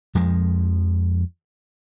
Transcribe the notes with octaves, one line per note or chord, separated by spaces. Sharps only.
F2 F3 G#3